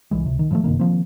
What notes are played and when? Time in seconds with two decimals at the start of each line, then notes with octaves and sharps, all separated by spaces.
0.11 C2 E3 G#3
0.26 C#2 C3
0.39 D#3
0.51 G2 F3 A3
0.64 F#1 C3 D#3 A#3
0.79 D#3 F3 A#3 C4